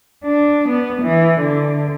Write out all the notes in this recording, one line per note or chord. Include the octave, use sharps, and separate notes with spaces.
D4
B3
E3
D3